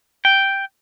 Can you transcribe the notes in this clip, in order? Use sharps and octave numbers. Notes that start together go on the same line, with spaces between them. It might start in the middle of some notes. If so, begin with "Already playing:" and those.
G5